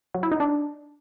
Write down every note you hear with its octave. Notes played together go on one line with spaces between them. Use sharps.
F#3
E4
D#4
D4